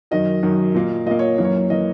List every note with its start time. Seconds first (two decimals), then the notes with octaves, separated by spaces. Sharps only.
0.11 F#2 D#3 F#3 D#5
0.43 F#2 D#3 F#3
0.75 A#2 A#3
1.06 A#2 A#3 D#5
1.19 C#5
1.38 F#2 E3 A#3
1.44 C#5
1.70 E3 A#3 D#5